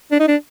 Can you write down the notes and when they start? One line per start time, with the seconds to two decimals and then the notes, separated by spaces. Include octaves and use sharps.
0.11 D4
0.20 D#4
0.28 D4